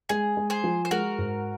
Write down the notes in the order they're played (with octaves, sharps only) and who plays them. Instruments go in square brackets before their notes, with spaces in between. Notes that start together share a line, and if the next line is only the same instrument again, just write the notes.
[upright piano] G#3 [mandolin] G#4
[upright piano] G#3
[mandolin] G#4 C5
[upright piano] F3
[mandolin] C5
[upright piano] G#3 [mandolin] F#4 A#4
[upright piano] G#2